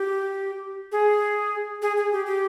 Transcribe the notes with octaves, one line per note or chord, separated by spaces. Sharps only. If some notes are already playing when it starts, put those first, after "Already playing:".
Already playing: G4
G#4
G#4
G#4
G4
G4